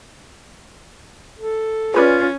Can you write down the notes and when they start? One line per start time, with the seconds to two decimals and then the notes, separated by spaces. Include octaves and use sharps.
1.39 A4
1.94 C#4 F4 G#4 B4 D5